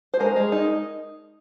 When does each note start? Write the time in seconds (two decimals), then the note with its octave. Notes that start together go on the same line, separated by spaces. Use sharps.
0.14 C5
0.20 G#3 A#4
0.36 G#3
0.52 D#4